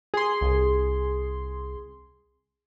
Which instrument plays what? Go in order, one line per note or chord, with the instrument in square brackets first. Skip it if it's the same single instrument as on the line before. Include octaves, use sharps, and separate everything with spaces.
[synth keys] G#4 C6
[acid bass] C2